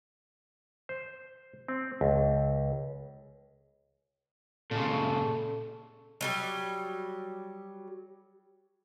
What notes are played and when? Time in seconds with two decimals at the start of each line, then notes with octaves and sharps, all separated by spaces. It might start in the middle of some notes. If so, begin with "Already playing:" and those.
0.89 C5
1.68 C4
2.01 C#2
4.71 A#2 C#3 A4
6.21 F#3 G3 G4